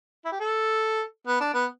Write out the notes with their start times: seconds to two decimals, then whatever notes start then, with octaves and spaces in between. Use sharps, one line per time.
0.25 E4
0.32 G4
0.40 A4
1.27 B3
1.41 D4
1.54 B3